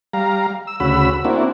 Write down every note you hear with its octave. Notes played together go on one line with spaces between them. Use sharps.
G3 F5 A#5
E6
D2 C#3 F#4 B5 E6
A#3 C4 D4 E4 F#4